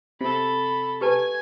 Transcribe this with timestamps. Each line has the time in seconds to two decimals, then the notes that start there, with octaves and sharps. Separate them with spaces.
0.21 C3 A4 B5
1.01 G4 B4 G#5 A5